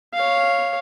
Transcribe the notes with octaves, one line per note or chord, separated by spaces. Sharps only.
C#5 F5